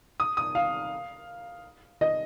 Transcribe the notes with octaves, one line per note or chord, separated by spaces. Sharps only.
D#6
D#6
F5
D#5